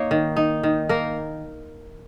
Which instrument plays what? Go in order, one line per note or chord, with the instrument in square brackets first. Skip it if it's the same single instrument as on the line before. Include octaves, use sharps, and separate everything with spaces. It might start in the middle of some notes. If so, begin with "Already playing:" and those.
Already playing: [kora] A#3 D#4 C#5
D#3
D#4
D#3
A#3 A#4